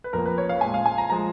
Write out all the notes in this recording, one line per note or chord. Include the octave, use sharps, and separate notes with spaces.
B4
F2 F3 A#3 A#4
B4
C#5
F5
A#2 G#3 G#5
F5
G#5
A#5
F3 G#3 A#5